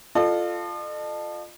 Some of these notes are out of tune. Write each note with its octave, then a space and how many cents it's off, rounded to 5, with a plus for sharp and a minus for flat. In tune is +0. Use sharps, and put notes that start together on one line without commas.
F4 +0 A4 +0 D#5 -45